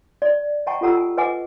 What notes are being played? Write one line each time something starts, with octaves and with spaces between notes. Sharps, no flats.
D5
D#5 F#5 G5 A5 A#5 C#6
F4 G4 A4 F#5 A#5 E6
A5
B4 D#5 F#5 G#5 D6